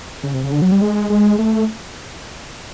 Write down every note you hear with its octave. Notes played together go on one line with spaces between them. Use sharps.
C#3
C3
C#3
D3
F#3
G3
G#3
G#3
A3